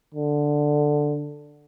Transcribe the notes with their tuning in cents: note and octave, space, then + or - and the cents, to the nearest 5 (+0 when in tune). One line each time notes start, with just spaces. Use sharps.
D3 +5